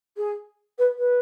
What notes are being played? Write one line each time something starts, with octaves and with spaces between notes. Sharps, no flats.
G#4
B4
B4